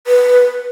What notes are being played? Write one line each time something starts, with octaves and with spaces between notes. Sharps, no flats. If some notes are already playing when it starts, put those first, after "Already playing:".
B4